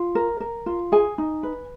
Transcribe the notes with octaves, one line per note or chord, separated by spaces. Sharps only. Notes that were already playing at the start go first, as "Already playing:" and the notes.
Already playing: F4
A#4
A#4
F4
G#4 G#5
D#4
B4